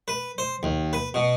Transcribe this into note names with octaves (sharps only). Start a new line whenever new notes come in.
B4
C5
D#2
B4
B2